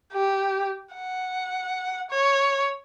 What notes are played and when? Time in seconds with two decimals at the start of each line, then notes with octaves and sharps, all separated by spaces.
0.13 G4
0.94 F#5
2.11 C#5